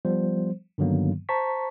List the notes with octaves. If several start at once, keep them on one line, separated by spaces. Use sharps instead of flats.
F3 G3 B3 C5
G2 D3 D#3 F#3 A#3 B3
C5 A5 A#5 C#6 B6